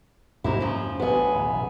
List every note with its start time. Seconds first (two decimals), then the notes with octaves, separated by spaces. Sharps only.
0.44 F2 G#2 C3 A#3 D#4 E4
0.60 C#3 F3
1.00 A1 G2 B3 G#4
1.35 D1 A1
1.51 B1 F#2